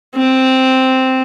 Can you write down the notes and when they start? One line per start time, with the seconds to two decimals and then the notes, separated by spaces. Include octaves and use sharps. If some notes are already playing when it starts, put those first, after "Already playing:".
0.16 C4